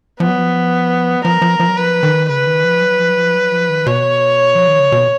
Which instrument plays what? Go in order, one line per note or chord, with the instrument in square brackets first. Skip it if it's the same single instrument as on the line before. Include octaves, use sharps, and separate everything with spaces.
[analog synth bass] F3 [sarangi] B3
[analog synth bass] F#3
F3
[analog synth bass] F3 [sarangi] A#4
[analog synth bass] F3
F3
F#3
[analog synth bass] F3 [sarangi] B4
[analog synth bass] D#3
[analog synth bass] C#3 [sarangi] B4
[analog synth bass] D#3
F3
F#3
F3
F#3
F3
F#3
F3
D#3
[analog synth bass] B2 [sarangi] C#5
[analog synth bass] F3
D#3
C#3
B2